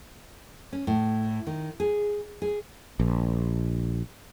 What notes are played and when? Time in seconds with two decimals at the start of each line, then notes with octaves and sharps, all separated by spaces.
0.73 C#4
0.87 A2
1.47 D#3
1.80 G#4
2.42 G#4
3.00 A#1